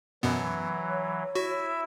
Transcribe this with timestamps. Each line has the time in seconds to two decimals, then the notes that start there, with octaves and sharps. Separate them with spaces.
0.23 F#2 B2 E3 F#3 B3
0.89 C#5
1.35 E4 F#4 E5